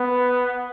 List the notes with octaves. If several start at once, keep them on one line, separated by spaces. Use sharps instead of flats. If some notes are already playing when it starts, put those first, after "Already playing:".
Already playing: B3